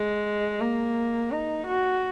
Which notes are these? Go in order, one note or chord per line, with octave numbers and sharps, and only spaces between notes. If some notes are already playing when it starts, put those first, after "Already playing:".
Already playing: G#3
A#3
D#4
F#4